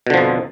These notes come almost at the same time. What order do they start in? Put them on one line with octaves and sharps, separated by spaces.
B2 D3 F3 F2